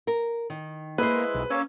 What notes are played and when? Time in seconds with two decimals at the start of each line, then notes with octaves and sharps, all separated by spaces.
0.07 A#4
0.50 D#3
0.98 G#3 A#3 E4 G#4 B4 C5
1.35 B1
1.50 A#3 C#4 C#5 E6